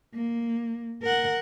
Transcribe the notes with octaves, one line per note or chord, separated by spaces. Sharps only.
A#3
A#4 F#5